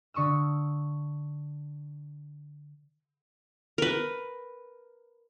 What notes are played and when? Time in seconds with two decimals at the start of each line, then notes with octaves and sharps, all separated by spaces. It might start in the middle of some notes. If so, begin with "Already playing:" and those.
0.14 D3 C#6 D#6 E6
3.78 A#4 B4